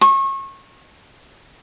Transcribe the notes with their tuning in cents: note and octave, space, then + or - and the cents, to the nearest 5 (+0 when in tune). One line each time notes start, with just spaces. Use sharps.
C#6 -30